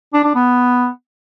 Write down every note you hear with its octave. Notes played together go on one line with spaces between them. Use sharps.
D4
D4
B3